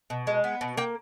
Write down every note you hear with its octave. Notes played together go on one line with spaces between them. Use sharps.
B2
G#3
B3
B2
A#3 G5